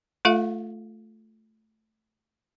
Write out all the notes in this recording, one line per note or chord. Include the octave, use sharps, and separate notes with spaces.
A3 F4 A4 E5 F5